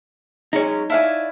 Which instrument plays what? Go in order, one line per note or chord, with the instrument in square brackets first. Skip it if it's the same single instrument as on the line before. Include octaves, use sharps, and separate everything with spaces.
[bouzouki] F#3 G#3 C#4 [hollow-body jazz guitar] D#4 C#5
[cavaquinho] E4 F5 G#5 [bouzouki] D5 A5